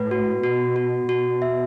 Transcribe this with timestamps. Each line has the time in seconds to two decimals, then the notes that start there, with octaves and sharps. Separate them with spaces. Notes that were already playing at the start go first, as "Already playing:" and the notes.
Already playing: A2 B4
0.11 F#4
0.44 B2 F#4
0.76 F#4
1.09 B2 F#4
1.42 E5